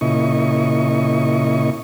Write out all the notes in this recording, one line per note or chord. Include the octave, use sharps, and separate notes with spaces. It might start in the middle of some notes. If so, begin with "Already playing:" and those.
A#2 C#3 E4 D#5 C#6